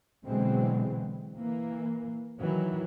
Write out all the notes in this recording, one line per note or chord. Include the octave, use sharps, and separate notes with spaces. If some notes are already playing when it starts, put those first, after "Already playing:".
B2 D3 E3 F#3 G#3 C4
E3 A#3
D#3 E3 F#3